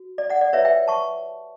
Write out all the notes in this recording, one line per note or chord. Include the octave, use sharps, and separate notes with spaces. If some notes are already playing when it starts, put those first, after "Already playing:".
Already playing: F#4
D5
D5 F#5
D5
E4 G4 B4 C#5 E5
E5 G5
A5 C#6